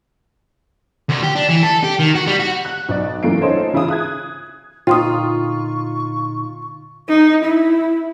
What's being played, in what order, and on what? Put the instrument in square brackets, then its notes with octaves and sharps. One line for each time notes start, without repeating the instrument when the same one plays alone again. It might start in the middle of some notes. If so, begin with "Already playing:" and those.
[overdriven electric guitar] D2
G4
D4
E3
A4
G4
D#3
F#4
G3
F#4
[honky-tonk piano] F#6
B1 D5
F#2 E3 A3 A#3 C7 D7
C#4 D#4 F4 A4 C5 C#5
C#3 E3 E4 F4 G#4 D#6
D#6 F#6 G#6
[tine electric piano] A#2 D3 D#4 [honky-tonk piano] F4 [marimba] G5 C6 D#6 [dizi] C#6
[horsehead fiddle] D#4
E4